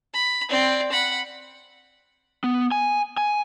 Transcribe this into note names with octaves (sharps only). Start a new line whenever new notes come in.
B5
C4 D5
F#5 B5
B3
G#5
G#5